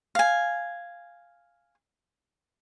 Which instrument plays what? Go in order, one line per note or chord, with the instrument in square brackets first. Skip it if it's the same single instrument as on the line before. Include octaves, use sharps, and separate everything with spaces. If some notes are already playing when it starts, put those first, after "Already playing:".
[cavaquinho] F5 G#5